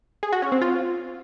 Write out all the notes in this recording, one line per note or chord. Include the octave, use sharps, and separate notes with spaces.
G#4
F#4
C#4
C4
F4